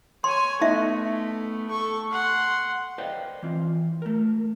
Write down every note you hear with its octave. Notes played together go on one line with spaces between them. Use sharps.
C#5 G#5 C6
A3 B3 D#4 D#5 E5
A4 C#6
F#5 C6
B4 C5 D5 D#5 F5 G5
E3 C4 F4
A3 A#4